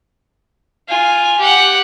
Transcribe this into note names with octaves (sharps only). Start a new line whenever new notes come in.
F4 G#5
G4 F#5